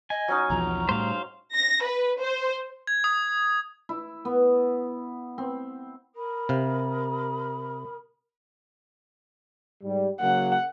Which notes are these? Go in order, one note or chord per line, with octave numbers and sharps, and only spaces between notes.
D#5 G#5
F#3 C#4 D#4
B1 E2 F3 A#5
A2 G3 C5 F5
A#6
B4
C5
G#6
D#6
E4
B3
C4
A#4 B5 D#6
C3 F5
G#2 G3
C#3 F#3 A#3 F#5